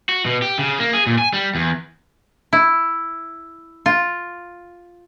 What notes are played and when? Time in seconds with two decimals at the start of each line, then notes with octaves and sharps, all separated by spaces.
0.09 F#4
0.25 B2
0.42 G4
0.59 C#3
0.80 A#3
0.93 G#4
1.07 A#2
1.19 G#5
1.33 G3
1.55 E2
2.53 E4
3.86 F4